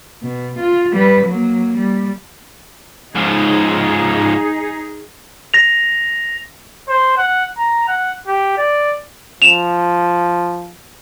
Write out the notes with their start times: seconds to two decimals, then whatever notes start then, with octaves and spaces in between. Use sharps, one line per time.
0.23 B2
0.59 F4
0.93 G3 B4
1.27 F#3 A#3
1.78 G3
3.15 G#2 F3 D#4 G#4
5.54 A#6 F7
6.89 C5
7.18 F#5
7.58 A#5
7.88 F#5
8.27 G4
8.58 D5
9.42 F3 E7 F7